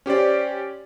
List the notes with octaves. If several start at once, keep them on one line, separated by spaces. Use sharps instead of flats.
C#4 G4 C5 D5